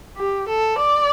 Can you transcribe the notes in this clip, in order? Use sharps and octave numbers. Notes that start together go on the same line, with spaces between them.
G4
A4
D5